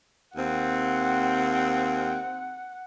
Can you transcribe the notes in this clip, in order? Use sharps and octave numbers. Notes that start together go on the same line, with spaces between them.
D#2 C4 F#5